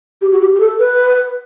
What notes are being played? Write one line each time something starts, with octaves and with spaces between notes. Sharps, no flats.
G4
F#4
G4
G4
A4
B4